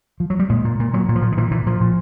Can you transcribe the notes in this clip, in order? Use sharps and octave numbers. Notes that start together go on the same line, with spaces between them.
F3
F#3
G3
A#2 G#3
A#2
A#2
A#2 F#3
A#2
F3
A#2
D#3
A#2 E3
A#2 E3
A#2 F3
A#2